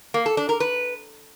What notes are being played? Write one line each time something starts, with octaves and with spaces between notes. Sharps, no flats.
A#3
A4
D4
A#4
B4